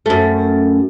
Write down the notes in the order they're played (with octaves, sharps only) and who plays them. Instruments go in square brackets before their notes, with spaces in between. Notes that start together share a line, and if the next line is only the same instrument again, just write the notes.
[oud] F#2 A3